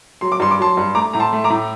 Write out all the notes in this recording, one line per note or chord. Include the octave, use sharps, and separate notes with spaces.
F#3 C6
D6
G2 C6
D6
F#3 A5 C6
G2
A3 A#5 D6
A2 A#5
A5 C6
A3
A#5 D6
A2